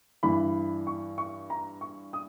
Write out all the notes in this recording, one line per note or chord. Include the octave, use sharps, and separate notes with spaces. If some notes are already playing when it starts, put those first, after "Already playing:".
G2 E3 B5
C#6
C#6
A#5
C#6
D#6